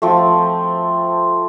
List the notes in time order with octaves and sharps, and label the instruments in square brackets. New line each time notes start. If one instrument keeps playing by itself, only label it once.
[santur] F3 A3 C4